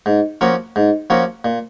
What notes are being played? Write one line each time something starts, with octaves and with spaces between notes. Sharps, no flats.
G#2
F3 A#3 C#4 F#4
G#2
F3 A#3 C#4 F#4
A#2